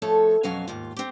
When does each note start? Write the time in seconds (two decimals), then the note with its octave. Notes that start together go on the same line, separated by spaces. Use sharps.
0.02 F3 A3 A4 C#5
0.43 F2 B2 F#3 C#4 F5 G#5
0.68 D#2 G#2 F4
0.97 C4 G4